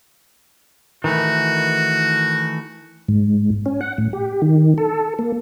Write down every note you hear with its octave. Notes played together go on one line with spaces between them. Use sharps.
D#3 E3 A3 F#4
G#2
C#4
F#5
A2
G4
D#3
A4
A#3